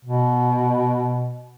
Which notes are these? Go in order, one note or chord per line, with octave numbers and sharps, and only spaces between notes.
B2